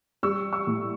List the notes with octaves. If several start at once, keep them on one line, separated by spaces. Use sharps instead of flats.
G3 C#6 E6
C#6 E6
A2